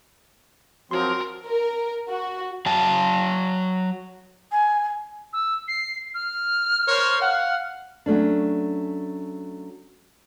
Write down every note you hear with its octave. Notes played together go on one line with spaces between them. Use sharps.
F3 F#3 C4 F#4 A#4 C6
A#4
F#4
F#3 G5 A5
G#5
E6
C7
F6
A#4 C5 C#5
F5 F#5
F#3 A3 C#4 D4